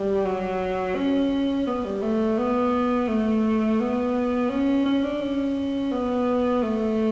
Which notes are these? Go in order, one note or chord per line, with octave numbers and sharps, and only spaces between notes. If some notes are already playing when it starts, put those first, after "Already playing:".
Already playing: G3
F#3
C#4
B3
G3
A3
B3
A3
B3
C#4
C#4
D4
C#4
B3
A3